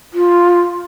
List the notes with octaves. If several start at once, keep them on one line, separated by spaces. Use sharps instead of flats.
F4